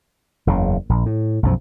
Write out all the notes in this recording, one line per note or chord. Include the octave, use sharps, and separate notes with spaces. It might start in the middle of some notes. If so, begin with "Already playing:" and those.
F#1 E2 C#3
A#1
A2
B1 F#2 F3